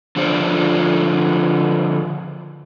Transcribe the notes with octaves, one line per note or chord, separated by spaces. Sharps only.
D3 F3 F4 G#4 C5 D5